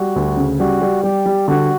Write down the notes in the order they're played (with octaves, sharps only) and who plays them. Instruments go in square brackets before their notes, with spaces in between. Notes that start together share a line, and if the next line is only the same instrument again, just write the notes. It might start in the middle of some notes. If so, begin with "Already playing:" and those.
Already playing: [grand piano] G3 [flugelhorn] F#4
[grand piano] D2
C#3
[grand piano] G3 [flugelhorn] F#4
[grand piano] G3
[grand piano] G3 [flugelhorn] G4
[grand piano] G3
[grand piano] D3 [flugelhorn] F#4